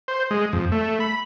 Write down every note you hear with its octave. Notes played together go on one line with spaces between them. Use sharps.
C5
G#3
F2
A3
B5